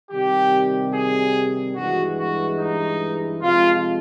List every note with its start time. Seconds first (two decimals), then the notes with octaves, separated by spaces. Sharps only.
0.11 C3 D#3 G3 G4
0.94 G#4
1.76 G2 E3 G#3 F#4
2.18 F#4
2.59 D#4
3.42 C3 F3 G#3 F4